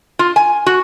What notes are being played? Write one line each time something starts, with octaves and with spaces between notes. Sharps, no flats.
F4
G#5
F#4